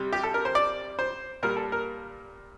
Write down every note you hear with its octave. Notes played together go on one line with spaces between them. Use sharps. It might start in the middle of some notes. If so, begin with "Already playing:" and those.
Already playing: C3 G3
G4
A4
A#4
C5
D5
C5
A#2 G3 A#4
A4
A#4